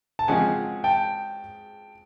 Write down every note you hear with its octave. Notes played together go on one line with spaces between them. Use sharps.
A5
C#3 F3 G#3 C4 F#5 G#5
G5 A5